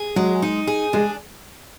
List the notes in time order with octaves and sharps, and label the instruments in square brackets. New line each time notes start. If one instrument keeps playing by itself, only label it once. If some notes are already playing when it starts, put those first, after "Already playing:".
Already playing: [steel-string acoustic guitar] G#4
[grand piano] F#3 [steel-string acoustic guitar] G#3
[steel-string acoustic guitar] D#4
G#4
[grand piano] G#3 [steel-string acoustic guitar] D4